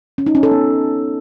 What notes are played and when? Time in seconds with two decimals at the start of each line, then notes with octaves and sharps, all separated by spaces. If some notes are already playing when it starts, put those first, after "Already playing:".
0.18 C#4
0.26 D#4
0.35 C#4
0.43 A4
0.51 B3